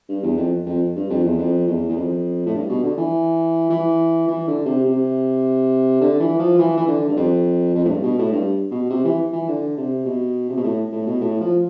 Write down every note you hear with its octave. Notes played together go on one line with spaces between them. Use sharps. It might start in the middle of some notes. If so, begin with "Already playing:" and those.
G2
E2
F2
F2
G2
F2
E2
F2
E2
E2
F2
A2
G2
B2
D3
E3
E3
E3
D3
C3
C3
D3
E3
F3
E3
E3
D3
G2
F2
F2
A2
G2
B2
A2
G2
B2
C3
E3
E3
D3
C3
B2
C3
B2
A2
A2
B2
A2
F3